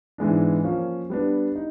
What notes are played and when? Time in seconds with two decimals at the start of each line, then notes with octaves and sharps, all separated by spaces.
0.18 G#2 E3 G#3 B3 D4
0.64 F3 A#3 C#4
1.10 G3 B3 D4
1.55 D#4